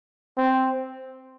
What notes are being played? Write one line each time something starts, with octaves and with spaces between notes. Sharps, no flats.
C4